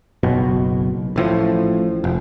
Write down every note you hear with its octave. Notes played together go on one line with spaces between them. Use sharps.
F#1 B1 B2
A1 A2 F3
F1